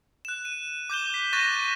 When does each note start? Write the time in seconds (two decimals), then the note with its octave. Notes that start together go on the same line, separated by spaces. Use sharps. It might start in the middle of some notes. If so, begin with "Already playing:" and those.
0.25 F#6 E7
0.45 D#7
0.90 D6 G6 E7 G7
1.14 B6
1.33 C#6 F#6 A6 A#6 D#7 E7